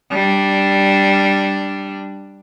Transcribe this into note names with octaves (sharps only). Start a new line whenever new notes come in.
G3 D4